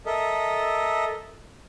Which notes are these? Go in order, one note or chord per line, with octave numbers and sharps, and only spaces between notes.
A4 A#4 D#5 E5